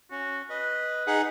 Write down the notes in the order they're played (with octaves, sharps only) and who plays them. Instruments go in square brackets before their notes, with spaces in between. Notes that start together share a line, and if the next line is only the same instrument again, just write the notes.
[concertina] C#4 [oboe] F#4
[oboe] B4 [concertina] D#5
[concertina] D#4 G#4 F#5